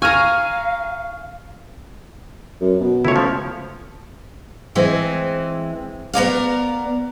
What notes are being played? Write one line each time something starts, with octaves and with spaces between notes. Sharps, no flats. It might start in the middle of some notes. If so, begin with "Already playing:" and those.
F5 G#5 A#5 C#6 F6 D#7
F#2
B2
C#2 A3 E4 C#5
C#3 F3
E3 G#3 C4
B3 A#4 D5 F5